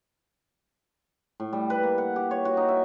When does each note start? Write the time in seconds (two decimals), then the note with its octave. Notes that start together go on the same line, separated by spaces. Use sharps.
1.40 A2
1.53 G3
1.70 B4
1.83 A#3
1.98 F#5
2.16 G4
2.31 C#5
2.45 F#4
2.57 D#4
2.69 E5